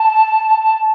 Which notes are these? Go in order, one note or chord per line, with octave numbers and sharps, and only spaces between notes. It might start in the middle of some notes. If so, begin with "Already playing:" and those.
Already playing: A5